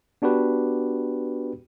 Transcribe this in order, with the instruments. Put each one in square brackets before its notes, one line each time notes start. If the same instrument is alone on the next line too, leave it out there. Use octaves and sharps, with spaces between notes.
[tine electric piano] B3 D4 F#4 G4 B4